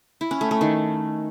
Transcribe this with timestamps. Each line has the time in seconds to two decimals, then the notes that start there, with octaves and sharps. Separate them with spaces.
0.21 E4
0.31 C#4
0.41 A3
0.51 A3
0.61 D#3